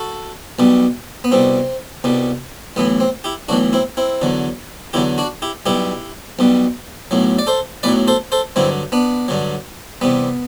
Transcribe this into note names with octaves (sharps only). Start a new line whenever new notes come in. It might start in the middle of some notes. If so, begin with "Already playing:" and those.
Already playing: F#4 A4
B1 B2 G3
B3
C2 B2 G3 C4
C2 B2 G3
B1 A2 E3 B3
C4
E4 G4
B1 A2 E3 D4 F#4
C4 E4
C4 E4
E2 D3 F#3
E2 D3 F#3 E4 G4
D4 F#4
E4 G4
B1 B2 G3 E4 G4
B1 B2 G3
B1 A2 F#3
D5
A4 C5
B1 A2 F#3 B4 D5
A4 C5
A4 C5
G2 D3 F#3 C4 E4
B3 D4
G2 D3 F#3
E2 C3 G3 B3